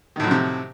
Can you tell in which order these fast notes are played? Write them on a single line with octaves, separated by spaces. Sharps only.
D#3 A2 F#3 F3 C3